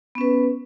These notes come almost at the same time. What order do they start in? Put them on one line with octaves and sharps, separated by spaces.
B3 C#4 B4